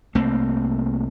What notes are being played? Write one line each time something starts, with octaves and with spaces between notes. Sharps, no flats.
C2 A3 A#3 C4